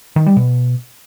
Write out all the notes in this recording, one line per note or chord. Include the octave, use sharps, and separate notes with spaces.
D#3
G3
B2